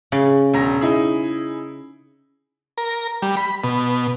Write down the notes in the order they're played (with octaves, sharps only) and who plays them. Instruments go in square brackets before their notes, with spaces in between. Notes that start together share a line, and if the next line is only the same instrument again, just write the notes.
[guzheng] C#3
[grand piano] E1 A#5 A#6
D#4 E4 G#4
[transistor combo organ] A#4
G3
B5
B2